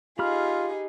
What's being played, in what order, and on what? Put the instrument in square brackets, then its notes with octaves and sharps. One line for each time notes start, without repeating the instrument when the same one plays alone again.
[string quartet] D#4 G#4 [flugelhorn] F4 [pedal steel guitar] G4 B5 F6